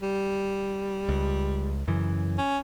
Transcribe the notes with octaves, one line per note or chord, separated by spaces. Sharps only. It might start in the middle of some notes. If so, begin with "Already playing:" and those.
G3
C#2
F#2 C#3 E3
C#4